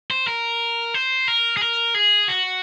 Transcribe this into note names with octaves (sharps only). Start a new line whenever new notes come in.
C5
A#4
C5
A#4
G#4
A#4
G#4
F#4